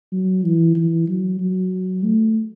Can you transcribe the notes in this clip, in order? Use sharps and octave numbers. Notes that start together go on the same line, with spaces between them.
F#3
E3
E3
F#3
F#3
A3